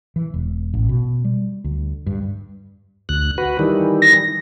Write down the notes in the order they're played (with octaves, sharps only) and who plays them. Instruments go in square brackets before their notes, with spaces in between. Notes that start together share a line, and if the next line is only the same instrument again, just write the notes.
[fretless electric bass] E3
E1
A1
B2
G3
D2
G2
[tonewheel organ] D2 F#6
F#4 B4
D#3 E3 G3
[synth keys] A#6